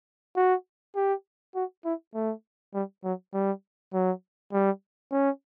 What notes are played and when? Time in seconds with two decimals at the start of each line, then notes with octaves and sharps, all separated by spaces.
0.36 F#4
0.95 G4
1.55 F#4
1.85 E4
2.15 A3
2.74 G3
3.04 F#3
3.34 G3
3.93 F#3
4.52 G3
5.12 C#4